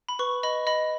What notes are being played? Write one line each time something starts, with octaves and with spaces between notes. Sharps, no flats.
B5
B4 C#6
D#5 B5
D#5 B5